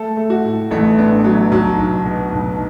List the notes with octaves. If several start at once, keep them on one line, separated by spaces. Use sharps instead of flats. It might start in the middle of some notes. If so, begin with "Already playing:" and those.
Already playing: A3 A4
A3
F#4
A2
A1 A3
B3 D4
F#3 D4
B1 F#3
B1
B2
B1